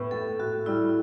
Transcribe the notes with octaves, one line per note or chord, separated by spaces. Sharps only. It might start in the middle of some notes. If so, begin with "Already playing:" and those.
Already playing: A2 B3
A2 A4
A2 F#4
G3 E4